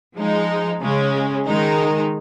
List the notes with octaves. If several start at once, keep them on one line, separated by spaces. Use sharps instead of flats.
F3 G#3 D#4
C#3 G#3 C#4
D#3 G#3 D#4